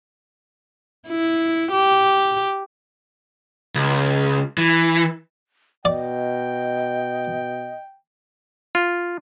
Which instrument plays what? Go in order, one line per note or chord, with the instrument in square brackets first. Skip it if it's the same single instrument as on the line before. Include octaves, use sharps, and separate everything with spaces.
[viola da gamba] E4
G4
[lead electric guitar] C#2
E3
[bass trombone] B2 [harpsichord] D5 [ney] D#5 [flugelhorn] G5
[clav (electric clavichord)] F4